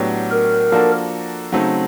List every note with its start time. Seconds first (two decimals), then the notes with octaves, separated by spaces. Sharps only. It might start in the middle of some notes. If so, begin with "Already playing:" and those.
Already playing: A2 F#3 B3 D4 G4
0.31 A#4
0.72 F3 A#3 D4 F#4 A4
1.52 C#3 F#3 A3 C4 D#4